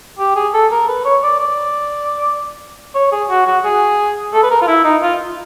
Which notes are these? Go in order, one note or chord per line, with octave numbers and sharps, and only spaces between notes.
G4
G#4
A4
A#4
B4
C#5
D5
D5
C#5
G#4
F#4
F#4
G#4
A4
B4
A#4
F4
E4
D#4
F4